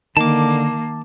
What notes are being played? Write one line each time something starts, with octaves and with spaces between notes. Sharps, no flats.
D3 D#3 A#3 A5 D6